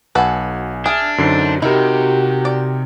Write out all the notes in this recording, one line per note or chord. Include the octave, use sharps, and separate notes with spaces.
B1 F#4 A4 B4 G#5
D4 G#4 E5 F6
F#2 D3 D#4 C5 C7
C3 D#4 E4 F#4 G4 A#4
D5